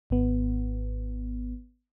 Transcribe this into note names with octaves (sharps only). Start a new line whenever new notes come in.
G#1 B3